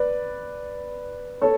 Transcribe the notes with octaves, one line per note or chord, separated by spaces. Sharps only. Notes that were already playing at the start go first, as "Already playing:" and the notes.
Already playing: B4 D5
A4 C#5